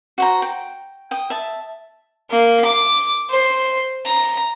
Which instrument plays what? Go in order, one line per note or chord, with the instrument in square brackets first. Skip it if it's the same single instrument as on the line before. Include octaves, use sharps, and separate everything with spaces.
[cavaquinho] F#4 C5 A#5
G5
G5 D#6
E5 A5
[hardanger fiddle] A#3
D6
C5
A#5